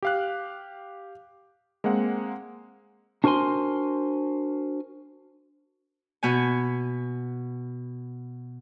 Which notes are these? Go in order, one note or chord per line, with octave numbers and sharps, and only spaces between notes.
G4 F5 F#6
G#3 A#3 C4 F#5
D4 F#4 A#4 C5 G#5 C6
B2 B3 G#5